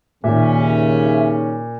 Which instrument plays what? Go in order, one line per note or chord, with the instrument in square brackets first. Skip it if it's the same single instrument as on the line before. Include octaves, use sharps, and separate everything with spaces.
[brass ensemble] D#2 C#3 C#4 [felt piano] A#2 [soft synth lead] E5